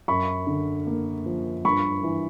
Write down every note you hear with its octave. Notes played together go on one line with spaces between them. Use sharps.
F#2 B5 C#6
D3
A#3
F3
G2 B5 C#6
E3